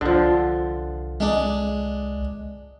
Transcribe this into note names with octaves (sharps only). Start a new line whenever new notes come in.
C2 D3 F3
G#3 D4